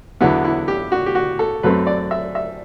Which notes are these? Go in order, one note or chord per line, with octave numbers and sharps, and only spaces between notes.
E2 D3 F#3 B3 E4
E4
G4
F#4
G4
F#4
A4
F#2 F#3 A3 C4 B4
D5
E5
E5